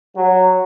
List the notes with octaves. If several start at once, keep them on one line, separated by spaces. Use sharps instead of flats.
F#3